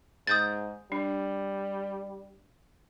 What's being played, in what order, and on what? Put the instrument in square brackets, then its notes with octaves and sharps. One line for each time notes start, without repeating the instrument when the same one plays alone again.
[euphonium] G#2 [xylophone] D#6 G6 A6
[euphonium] G3 [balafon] D4